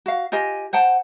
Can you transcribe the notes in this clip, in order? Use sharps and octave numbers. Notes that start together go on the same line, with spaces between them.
F#4 F5
F4 G4 D#5 G#5
C5 F#5 G5 A5